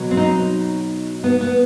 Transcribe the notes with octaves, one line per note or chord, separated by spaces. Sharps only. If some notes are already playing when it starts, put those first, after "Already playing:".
Already playing: B2 F#3
C4
D#4
B3
B3